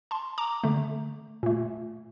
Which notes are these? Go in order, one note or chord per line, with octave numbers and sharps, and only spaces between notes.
A5 C6
A#5 D6
D3 A3
A#2 A3